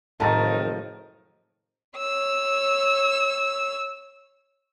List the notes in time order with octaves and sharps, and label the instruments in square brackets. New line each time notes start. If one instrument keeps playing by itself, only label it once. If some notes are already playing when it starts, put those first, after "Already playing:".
[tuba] F#1 [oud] A2 F3 [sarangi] D#3 [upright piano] A5 A#5 A6
[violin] C#5 E6